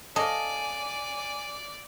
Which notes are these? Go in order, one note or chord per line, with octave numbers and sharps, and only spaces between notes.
A4 D5 D#5 F5 G#5